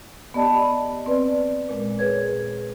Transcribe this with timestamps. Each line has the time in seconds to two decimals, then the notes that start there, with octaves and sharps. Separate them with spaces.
0.34 B3 G4 D5 D#5 A5 B5
1.06 C4 B4 D5
1.69 A#2 G#3
1.99 G#4 B4 C#5 G#6